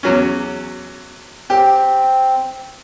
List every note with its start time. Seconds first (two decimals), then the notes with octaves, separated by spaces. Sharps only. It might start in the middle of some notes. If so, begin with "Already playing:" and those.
0.03 E2 F#3 C#4
1.50 C4 G4